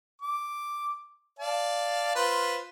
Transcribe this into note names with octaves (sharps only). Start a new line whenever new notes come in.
D6
D5 F5 A5
F4 B4 C5